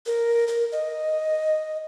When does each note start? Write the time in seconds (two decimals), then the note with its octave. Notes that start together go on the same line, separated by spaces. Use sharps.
0.06 A#4
0.48 A#4
0.72 D#5